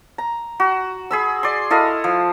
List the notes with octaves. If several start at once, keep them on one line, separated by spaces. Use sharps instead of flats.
A#5
F#4
G#4 B5 E6
D5 C6
E4 A4 D#5 F5
F3